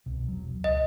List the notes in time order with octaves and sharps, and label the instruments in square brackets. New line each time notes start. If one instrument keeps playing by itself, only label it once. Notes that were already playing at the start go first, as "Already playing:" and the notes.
[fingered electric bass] C2 B2
E1 F#3
[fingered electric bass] C#2 [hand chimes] D#5